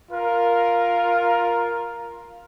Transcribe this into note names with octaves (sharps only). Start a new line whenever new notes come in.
F4 A#4